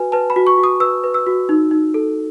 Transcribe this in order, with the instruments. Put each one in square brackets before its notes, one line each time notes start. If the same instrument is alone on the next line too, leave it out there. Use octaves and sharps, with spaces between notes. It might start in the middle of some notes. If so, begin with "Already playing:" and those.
Already playing: [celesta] F#4 B4 G#5
B4 A5
B5
F#4
C#6
F#4
D#6
B4 E6
B4
E6
F#4
D#4
D#4
A4